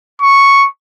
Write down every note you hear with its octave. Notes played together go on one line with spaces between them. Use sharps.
C#6